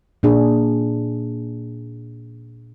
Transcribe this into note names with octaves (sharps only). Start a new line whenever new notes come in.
A#2 D4 G#4